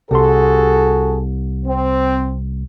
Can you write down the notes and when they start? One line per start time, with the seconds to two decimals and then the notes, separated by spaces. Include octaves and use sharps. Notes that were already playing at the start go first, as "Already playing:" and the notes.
0.11 C2 F#4 G#4 A4 C6
1.66 C4